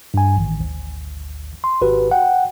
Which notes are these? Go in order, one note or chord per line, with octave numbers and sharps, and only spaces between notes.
G2 G#5
A1 D#3
G#1 D2
C6
G#1 F#4 G4 B4
F#5 G5